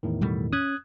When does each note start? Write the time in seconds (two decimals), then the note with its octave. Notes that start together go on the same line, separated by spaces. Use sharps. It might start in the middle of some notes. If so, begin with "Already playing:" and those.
0.03 E2 A2 D#3
0.21 B2 G3 A3
0.53 C#4 D#6 F#6 G#6